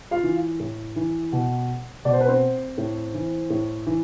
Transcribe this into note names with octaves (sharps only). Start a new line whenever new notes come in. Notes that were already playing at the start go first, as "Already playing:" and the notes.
F4 F5
E3
A2
E3
B2
B2 D5
C5
B4
C4 C5
A2
E3
A2
E3